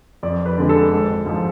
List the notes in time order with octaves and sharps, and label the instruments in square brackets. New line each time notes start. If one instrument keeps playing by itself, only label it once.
[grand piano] F2 D5
B4
D3 G#3
A4
G#1
G#2 F3